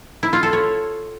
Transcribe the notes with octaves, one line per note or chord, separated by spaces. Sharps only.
E4
F4
A4
C#5